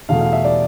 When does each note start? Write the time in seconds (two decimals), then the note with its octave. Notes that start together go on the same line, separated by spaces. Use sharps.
0.09 E2 B2 A3 F5
0.21 F5
0.33 E5
0.44 D5